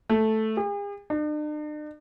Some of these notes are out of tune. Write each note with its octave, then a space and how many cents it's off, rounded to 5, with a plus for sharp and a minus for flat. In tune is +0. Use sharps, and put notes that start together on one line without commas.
A3 -5
G#4 -45
D4 +45